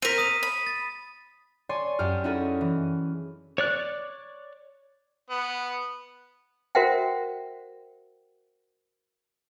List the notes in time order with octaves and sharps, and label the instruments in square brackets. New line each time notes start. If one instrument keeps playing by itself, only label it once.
[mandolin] C4 A#4 [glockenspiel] B6 D#7
[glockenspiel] D#6 D#7
[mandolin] B5
[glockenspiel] A6
[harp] C#5 D5 G#5 A5 C6
F#2 F#4 G4 F6
C#4 D#4 E4 F#4 G#4 A4
E3
[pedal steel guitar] C#5 D5 F#6
[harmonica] B3
[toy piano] F#4 A#4 C5 E5 F#5 G5